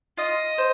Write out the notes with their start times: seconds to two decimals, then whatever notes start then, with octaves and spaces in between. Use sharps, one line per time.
0.18 F4 D#5
0.58 C5